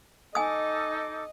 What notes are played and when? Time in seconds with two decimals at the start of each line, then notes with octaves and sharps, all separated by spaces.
0.35 D#4 A4 D#5 G#5 D6 D#6